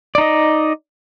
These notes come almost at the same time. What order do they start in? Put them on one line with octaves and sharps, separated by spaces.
D5 D#4 D#5